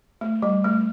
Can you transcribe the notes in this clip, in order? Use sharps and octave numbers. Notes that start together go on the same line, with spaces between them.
A3
G3
A3